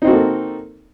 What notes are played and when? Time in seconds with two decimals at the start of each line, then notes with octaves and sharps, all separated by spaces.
0.02 D#4
0.05 C4
0.07 F#4
0.10 A#3
0.13 A4